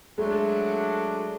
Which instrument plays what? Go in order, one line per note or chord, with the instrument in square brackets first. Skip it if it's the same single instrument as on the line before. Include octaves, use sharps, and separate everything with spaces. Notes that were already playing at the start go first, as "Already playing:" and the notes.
[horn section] F#3 A3 D4 [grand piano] G#3